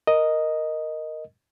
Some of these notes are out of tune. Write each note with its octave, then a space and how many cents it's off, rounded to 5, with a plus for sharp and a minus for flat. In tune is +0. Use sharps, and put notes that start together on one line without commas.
A#4 +0 D#5 +0